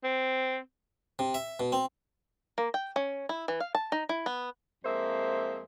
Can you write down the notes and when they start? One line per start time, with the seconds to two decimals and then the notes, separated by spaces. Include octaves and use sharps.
0.04 C4
1.19 C3
1.34 E5
1.60 B2
1.72 C4
2.58 A#3
2.74 G5
2.96 C#4
3.29 E4
3.48 E3
3.60 F5
3.75 A5
3.92 D#4
4.09 E4
4.26 B3
4.85 F2 G#3 A#3 C5 E5